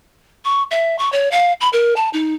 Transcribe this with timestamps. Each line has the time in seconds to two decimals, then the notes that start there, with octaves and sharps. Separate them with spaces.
0.45 C#6
0.71 E5
0.99 C#6
1.12 C#5
1.31 F5
1.61 B5
1.73 A#4
1.96 A5
2.13 D#4